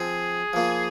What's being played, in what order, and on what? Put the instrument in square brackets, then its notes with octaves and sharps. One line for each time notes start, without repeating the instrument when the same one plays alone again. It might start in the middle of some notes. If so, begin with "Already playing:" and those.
Already playing: [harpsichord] F3 C4 F4 [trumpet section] G#4
[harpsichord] F3 A#3 F4